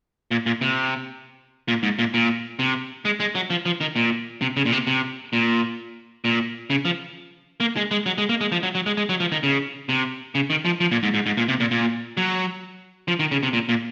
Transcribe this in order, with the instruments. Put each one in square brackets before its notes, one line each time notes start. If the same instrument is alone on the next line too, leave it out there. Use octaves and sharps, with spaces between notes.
[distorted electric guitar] A#2
A#2
C3
A#2
G#2
A#2
A#2
C3
G#3
G#3
F#3
F3
F3
D#3
A#2
C3
C#3
A#2
C3
C3
A#2
A#2
C#3
F3
A#3
G#3
G#3
F#3
G#3
A#3
G#3
F3
F#3
F#3
G#3
G#3
F#3
F3
D#3
C#3
C3
C#3
D#3
F3
F3
A#2
G#2
G#2
G#2
A#2
C3
A#2
A#2
F#3
F3
D#3
C#3
C3
A#2
A#2